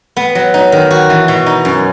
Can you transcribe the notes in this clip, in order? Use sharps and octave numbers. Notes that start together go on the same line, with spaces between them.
B3
F#3
D#4
D#3
F#4
E3
B2
D#4
F#2